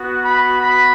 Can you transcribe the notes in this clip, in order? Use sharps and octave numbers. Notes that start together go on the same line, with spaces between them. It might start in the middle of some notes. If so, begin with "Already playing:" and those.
Already playing: B3 F#4
B5
B5